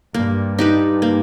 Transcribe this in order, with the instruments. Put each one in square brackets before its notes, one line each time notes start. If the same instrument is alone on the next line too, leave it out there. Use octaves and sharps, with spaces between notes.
[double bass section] G2 [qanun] A#3
[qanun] D#4 G4 B4
A#3